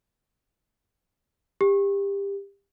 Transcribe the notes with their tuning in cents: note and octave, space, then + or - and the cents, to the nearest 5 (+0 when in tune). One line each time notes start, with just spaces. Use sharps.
G4 +25